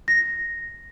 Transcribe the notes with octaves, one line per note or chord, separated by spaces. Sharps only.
A#6